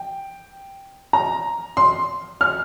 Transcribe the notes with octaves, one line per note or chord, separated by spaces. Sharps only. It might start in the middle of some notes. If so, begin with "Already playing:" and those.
Already playing: G5
A#5
C6
F6